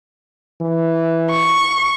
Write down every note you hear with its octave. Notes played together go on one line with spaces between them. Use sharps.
E3
C#6